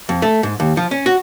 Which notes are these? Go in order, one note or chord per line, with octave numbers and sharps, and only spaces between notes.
F2
A3
G#2
D#2
F3
C#4
F#4